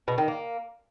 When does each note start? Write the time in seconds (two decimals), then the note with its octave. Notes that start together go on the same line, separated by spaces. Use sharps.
0.08 B2
0.18 D#3
0.28 A#3